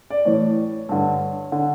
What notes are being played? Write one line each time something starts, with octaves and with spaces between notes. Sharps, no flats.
D5
A2 E3 C#5
G2 D3
D3